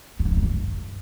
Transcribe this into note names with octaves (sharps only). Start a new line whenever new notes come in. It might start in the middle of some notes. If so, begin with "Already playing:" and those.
G2
D#3
G2
F2
G2